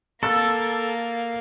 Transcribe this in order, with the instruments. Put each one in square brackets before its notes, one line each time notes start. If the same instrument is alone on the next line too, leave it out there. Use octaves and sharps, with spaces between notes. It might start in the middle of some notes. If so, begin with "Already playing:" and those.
[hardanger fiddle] A#3 [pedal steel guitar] A4 [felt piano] E6 A6